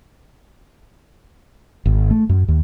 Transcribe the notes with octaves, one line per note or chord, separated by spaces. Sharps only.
G#1
A3
F#2
D#2